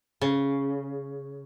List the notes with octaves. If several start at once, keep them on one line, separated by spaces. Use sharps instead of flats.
C#3